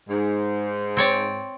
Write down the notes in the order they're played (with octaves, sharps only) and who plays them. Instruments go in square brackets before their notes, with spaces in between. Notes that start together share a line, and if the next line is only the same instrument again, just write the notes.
[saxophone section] G#2
[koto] C4 C#5 D5